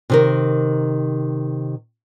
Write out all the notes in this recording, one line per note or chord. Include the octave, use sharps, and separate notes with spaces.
C3 D#3 A#4